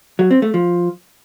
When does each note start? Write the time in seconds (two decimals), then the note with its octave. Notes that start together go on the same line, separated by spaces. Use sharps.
0.19 F#3
0.31 C4
0.42 A3
0.54 F3